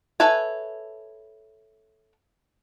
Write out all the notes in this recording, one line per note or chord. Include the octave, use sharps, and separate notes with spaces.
A4 B4 C#5 E5 G#5